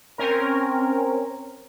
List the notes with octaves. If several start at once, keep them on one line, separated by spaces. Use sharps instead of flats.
C4 C#4 A#4